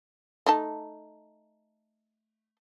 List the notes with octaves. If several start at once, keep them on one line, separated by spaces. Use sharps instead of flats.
A3 D#4 A5